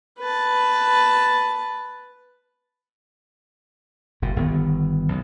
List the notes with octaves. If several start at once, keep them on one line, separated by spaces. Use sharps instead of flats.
B4 A5
F#1 A#2
G1 D#3 B3
B1 F#2